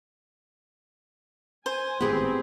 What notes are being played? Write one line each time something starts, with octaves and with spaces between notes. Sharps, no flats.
C5 G#5
G#1 A2 B3 C4 G4 G#4 B4